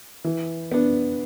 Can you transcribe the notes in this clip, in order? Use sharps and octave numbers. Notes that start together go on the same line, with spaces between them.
E3
B3 D4